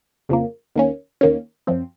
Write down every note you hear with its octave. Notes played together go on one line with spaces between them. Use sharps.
F2 C#3 F3 A#3
D#2 D#3 A#3 C#4
D#2 D#3 A#3 C#4
F#2 F3 C4